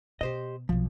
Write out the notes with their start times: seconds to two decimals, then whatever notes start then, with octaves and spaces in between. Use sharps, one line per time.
0.21 B2 G4 C5 D#5
0.69 B1 B2 F3